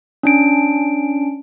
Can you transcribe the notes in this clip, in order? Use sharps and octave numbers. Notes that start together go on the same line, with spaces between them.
C#4 D4 D7